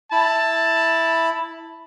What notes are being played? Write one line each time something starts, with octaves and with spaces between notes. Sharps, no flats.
E4 A5 B5